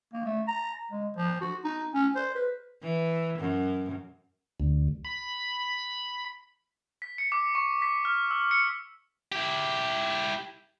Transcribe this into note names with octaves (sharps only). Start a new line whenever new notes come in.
A#3
A3
A#5
G#3
F3
F#4
D#4
C#4
C5
B4
E3
F#2
D2
B5
B6
C#7
D6
C#6
B6
F6
E6
C#7
E4 G4